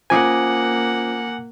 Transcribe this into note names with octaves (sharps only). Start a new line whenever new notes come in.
A#3 C#4 F4 C5 F#5 G#5 D6 D#6